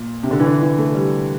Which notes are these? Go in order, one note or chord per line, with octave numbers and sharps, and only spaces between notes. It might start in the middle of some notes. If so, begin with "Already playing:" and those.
Already playing: A#2
C3
D3
E3
D3
E3
A3
G3